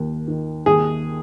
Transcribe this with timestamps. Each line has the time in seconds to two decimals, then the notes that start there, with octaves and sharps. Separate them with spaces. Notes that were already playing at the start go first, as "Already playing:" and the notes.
Already playing: D#2 A#3
0.28 D#3
0.66 D#2 G#4